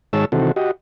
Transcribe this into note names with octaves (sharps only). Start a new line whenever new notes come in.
G#2 D#3 G#3 C#5 A5 E6
C3 D#3 E3 C4 F#4 A4
F#4 G4 D#5